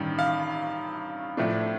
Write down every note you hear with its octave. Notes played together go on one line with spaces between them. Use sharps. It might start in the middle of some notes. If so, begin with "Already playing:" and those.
Already playing: A1 G2 D#3
F5
A2 F3 A3 D4